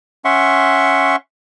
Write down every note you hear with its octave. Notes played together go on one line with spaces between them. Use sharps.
C#4 E5 F#5 C6 C#6